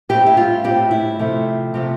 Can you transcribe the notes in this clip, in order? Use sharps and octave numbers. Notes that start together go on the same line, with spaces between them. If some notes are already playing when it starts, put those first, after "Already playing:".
A2 G3 C4 G4
E4
F4
A2 G3 C4 G4
E4
C3 F3 A3
C3 F3 A3